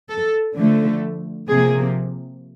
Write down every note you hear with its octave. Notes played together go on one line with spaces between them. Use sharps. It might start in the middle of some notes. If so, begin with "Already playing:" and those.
A4
D3 F3 A3
C3 F3 A#3 G#4